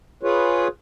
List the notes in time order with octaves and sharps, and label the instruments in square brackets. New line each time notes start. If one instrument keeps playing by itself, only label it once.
[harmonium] F4 G#4 B4 C#5